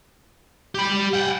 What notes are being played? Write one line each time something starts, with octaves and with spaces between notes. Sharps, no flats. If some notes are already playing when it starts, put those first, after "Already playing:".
G4 B5
F#5 G5